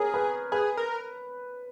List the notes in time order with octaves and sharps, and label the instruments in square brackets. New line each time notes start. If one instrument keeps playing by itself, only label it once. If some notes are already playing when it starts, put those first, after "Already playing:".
Already playing: [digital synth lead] G#4 [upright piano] A#4 C#5
[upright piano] B4
[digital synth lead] G#4 [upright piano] B4
[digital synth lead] A#4